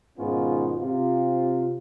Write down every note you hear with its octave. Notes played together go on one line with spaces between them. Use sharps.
G#2 B2 D#3 B3 C#4 F4
C3 F4